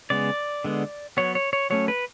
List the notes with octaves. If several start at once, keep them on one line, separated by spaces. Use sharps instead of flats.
C#3 G#3 B3 D5
D3 G#3 B3
F#3 B3 C#5
C#5
C#5
F#3 A3 C#4 C#5
B4